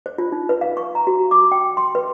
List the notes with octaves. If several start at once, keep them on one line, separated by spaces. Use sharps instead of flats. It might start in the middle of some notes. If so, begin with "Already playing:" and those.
C5
F4
D#4
B4
F5
C#6
A#5
F#4
D6
G5
C6
B4